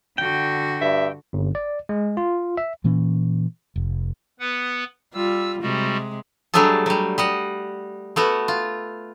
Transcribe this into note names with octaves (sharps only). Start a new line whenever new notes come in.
D3 F#4 G5
G2 E5
G1
D5
G#3
F4
E5
A#2 E3 A#3 C#4
F1
B3 B4 F#5
G3 F4 E6
C3 G3 G#3 F#4
F#3 G3 A3 D4 G#4 A4
F#3 G3
G3 D#5 F#5
A3 B3 F#4
F4